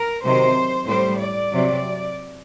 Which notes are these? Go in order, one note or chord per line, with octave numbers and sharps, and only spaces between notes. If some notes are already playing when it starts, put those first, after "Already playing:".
Already playing: A#4
C3 D#3 F#3 C5
A2 G3 C5
D5
C3 F#3